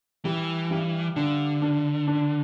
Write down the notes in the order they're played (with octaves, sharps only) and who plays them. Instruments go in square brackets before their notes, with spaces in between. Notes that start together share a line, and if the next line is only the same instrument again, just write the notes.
[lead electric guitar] E3 [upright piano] G3
[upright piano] G2
[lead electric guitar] D3 [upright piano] D4
[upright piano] D4
D4